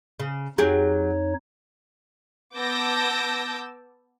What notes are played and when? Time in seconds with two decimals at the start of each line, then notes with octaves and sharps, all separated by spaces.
0.20 C#3
0.58 F2 F#3 D#4 G4 G#4 C#5
2.57 B3 A5 D6 E6 G6 A#6